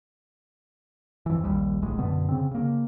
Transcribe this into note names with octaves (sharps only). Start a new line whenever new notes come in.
F2 E3
A#1 D#2 G3
D#1 A#1 A2 G#3
F#2 B2 D3 B3
C#3 C4
C#3 A#3